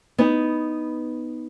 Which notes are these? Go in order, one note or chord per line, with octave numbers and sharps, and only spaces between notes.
B3 D#4